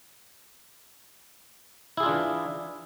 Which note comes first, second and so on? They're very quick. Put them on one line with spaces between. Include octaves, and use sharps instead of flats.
E4 G#4 F4 D4 E3